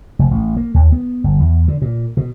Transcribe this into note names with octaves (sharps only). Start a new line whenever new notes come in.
F1
A1
A#3
D#2
B3
G1
E2
D3
A#2
B2